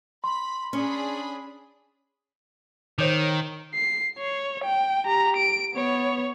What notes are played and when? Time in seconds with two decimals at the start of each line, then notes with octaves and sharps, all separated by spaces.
0.24 B5 C6
0.73 C#4 D4 G#4 B5
2.99 D#3 C5 C#5 D6
3.74 C7
4.18 C#5
4.64 G5
5.06 G4 A#5
5.36 D7
5.74 B3 C#5